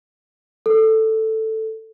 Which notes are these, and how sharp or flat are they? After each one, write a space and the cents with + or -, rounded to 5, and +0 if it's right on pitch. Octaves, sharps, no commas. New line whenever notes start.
A4 +5